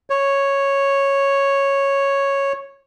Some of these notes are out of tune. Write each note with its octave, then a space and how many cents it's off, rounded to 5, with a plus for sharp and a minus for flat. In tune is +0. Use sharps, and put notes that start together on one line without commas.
C#5 -5